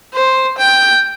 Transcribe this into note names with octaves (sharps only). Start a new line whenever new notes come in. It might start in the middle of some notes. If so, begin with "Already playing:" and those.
C5
G5